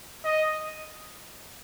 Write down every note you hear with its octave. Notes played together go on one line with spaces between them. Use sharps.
D#5